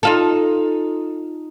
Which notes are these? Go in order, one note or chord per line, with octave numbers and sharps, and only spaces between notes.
D#4 F4 A4